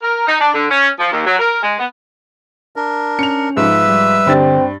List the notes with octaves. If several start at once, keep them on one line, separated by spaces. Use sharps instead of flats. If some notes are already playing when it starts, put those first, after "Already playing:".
A#4
D#4
D4
D3
C#4
F3
D#2
F#3
A#4
G#3
B3
D4 A#4
C#4 C#7 F7
G#2 F3 B4 E5 E6
G3
G2 D3 C4 D4 A6